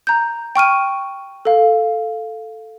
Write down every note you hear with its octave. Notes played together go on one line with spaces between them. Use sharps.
A#5 G6
G5 C#6 F6 D#7
A4 F5